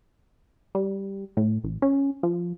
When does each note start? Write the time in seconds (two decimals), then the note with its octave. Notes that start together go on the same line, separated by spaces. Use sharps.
0.75 G3
1.37 A2
1.64 A1
1.82 C#4
2.23 F3